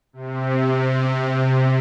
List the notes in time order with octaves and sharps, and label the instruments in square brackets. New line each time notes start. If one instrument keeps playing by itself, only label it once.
[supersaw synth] C3